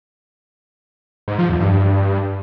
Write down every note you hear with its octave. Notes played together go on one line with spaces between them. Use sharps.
G#2
F3
E2
G2